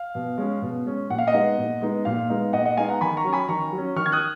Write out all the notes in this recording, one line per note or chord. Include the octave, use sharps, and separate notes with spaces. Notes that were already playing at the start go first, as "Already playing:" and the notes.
Already playing: F5
B2
G#3 C#4
B2
G#3 C#4
A#2 F#5
F5
D#5 F#5
G#3 B3 D#4
A#2
G#3 B3 D#4
A#2 F5
G#3 B3 D#4
A#2 D#5 F#5
D#5 F#5
G#3 B3 D#4 F5 G#5
F#5 A#5
D#3 G#5 B5
A#5 C#6
F#3 C#4
G#5 B5
D#3 A#5 C#6
F#3
C#4
D#3 C#6 F6
G#6
D#6 F#6